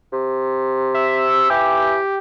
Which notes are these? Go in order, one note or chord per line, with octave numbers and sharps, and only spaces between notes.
C3
E5
E3 G4